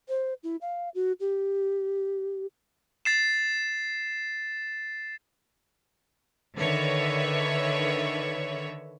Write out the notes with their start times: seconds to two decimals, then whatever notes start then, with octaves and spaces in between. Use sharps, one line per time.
0.09 C5
0.43 E4
0.61 F5
0.95 F#4
1.20 G4
3.05 A6 C7 E7
6.56 D3 D#3 B4 C#5 E5